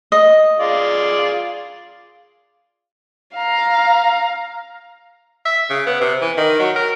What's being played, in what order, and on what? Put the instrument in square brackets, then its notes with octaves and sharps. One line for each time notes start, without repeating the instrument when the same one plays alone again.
[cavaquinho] D#5
[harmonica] F4 G#4 D5
[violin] F5 A#5
[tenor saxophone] E5
C#3
B3
C3
E3
D#3
F#3
A#4